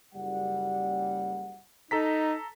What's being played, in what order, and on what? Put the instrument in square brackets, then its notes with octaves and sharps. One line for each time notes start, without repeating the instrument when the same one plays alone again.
[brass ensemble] F#1 G3 F#5
[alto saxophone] D#4 [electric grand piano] A4 A#5 B6